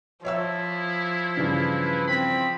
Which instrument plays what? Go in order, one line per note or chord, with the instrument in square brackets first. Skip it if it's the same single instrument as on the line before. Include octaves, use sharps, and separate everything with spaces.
[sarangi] F3 [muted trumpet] E4 [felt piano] C#5 E5 E6
[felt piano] G2 C#3 E3 [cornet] B4
[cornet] C4 [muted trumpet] B5